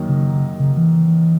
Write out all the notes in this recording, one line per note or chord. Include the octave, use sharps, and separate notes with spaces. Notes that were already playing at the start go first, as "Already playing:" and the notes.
Already playing: F#2 D#3 F#3 A#3
C#3
C#3
E3